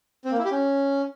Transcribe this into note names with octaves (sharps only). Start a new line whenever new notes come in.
C4
A#3
E4
G4
C#4